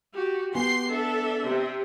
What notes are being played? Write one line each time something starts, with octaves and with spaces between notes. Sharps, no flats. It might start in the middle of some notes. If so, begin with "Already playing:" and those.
F#4 G4
B3 G4 G#5 C6 C7
D4 A4 E5
C3